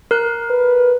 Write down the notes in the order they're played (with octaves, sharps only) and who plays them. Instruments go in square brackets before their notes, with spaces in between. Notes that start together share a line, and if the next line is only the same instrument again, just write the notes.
[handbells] A#4 F#6
[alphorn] B4